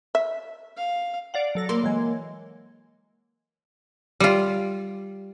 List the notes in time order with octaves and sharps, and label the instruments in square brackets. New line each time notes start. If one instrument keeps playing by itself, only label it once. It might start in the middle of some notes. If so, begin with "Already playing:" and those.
[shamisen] E5
[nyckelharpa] F5
[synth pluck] D5 F5 F#5
F#3 A4 A#6
[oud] A#3 A#4 [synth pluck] C6
[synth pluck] E3 F#3 G#3
[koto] G3 F4